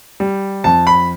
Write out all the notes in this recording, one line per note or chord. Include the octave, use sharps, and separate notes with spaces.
G3
F2 A5
B5